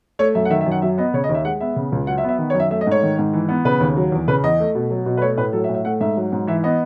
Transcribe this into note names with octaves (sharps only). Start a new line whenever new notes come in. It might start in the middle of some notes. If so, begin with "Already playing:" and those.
A3 C#5
F#2 E5
F#5
D#3 E5
E5
F#2
F#5
F#3 E5
B3 D#5
C#3 C#5
D#5
D#2
E5
G#3 F#5
B3 E5
C#3
C#2
F#3 F#5
E5
B3
E5
D#3
C#5
F#2
E5
A3 E5
D#5
G#2 C#5
D#3
G#2
E3
B3
C#3 B4
D#2
F#3
E2
C#3 B4
E2 D#5
A3
B2
F#3
B2
B4
A3 C#5
A2 B4
F#3 A4
E5
A2
E5
A3 F#5
G#2 E5
F#3
G#2
E3 E5
B3 D#5